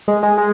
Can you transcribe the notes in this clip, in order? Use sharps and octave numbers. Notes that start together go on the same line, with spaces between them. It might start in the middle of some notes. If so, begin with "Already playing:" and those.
G#3
G#3
G#3